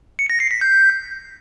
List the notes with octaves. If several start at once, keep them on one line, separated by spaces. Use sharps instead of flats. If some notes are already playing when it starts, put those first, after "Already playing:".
C#7
A#6
C7
B6
G6